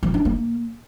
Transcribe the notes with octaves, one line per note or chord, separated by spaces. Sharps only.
F3
D4
A#3